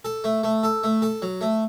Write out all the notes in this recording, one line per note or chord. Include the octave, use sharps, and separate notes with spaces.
A4
A3
A3
A4
A3
A4
F#3
A3